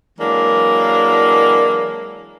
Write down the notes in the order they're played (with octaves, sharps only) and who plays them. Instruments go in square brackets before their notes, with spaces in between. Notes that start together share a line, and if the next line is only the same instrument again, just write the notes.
[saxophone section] E3 F#3 G#3 A#3 D4